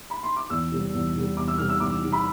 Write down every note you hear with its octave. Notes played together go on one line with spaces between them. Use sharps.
B5
C6
D6
E2 E6
C3 G3
E2
C3 G3
E2 D6
E6
C3 G3 F6
E6
E2 D6
C3 G3
B5